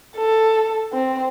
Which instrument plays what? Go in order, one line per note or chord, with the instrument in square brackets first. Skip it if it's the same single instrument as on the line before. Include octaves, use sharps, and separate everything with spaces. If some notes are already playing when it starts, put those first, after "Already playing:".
[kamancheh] A4
C4